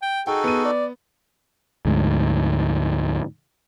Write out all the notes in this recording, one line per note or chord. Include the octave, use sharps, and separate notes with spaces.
G5
D#4 F#4 G#4 A4 G5
B3 D#7
D5
D2 G#2